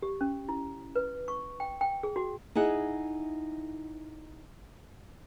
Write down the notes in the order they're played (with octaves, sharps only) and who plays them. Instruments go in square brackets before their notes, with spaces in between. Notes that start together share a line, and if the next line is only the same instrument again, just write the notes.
[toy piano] G4
C#4
E4
B4
C#6
G5
G5
G#4
F#4
[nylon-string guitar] D#4 E4 G#4 F#5